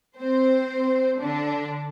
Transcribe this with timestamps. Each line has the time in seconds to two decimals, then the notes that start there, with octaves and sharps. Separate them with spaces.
0.17 C4 C5
1.20 D3 D4